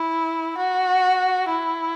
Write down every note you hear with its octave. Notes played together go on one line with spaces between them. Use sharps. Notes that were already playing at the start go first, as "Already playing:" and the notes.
Already playing: E4
F#4
E4